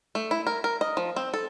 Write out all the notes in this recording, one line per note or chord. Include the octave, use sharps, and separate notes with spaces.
A3
E4
A#4
A#4
D#5
F3
C4
A4